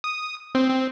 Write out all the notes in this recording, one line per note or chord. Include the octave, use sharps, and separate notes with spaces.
D#6
C4
C4